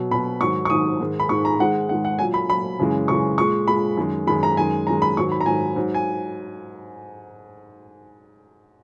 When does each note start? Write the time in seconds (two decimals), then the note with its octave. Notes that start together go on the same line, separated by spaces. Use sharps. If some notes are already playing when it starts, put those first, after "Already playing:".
Already playing: B2 F#3
0.11 B2 F#3 B5
0.41 G#2 D#3 F#3 C#6
0.65 C#6
0.70 G#2 D#3 F#3 D#6
1.00 G#2 D#3 G#3
1.20 B5
1.29 G#2 D#3 G#3 C#6
1.45 A#5
1.59 G#2 D#3 G#3 F#5
1.89 G#2 D#3 G#3 F#5
2.05 F#5
2.19 A#2 F#3 G#5
2.34 B5
2.49 A#2 F#3 B5
2.79 F#2 C#3 E3 G#3
3.08 F#2 C#3 E3 G#3 C#6
3.38 A#2 G#3 C#6
3.68 A#2 G#3 B5
3.97 F#2 D#3 G#3
4.27 F#2 D#3 G#3 B5
4.43 A#5
4.57 F#2 D#3 G#3 G#5
4.87 F#2 D#3 G#3 A#5
5.02 B5
5.17 G#2 D#3 F#3 C#6
5.32 B5
5.41 A#5
5.46 G#2 D#3 F#3 G#5
5.76 G#2 F#3
5.94 G#5